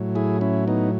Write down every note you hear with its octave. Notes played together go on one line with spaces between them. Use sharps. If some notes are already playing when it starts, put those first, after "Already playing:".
Already playing: A2 F#3
E4 G#4
C#4 E4
B3 D#4